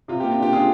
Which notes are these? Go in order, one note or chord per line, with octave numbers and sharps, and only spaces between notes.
C3 F4
A#3 G4
F4
D4 G4
D4 F4 G#4